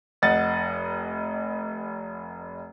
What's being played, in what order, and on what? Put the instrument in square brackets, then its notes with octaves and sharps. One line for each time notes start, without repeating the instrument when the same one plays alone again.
[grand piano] F1 D#5 F#5 A6